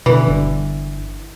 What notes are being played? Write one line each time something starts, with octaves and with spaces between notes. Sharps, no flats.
B2 D3 E3
G1 D3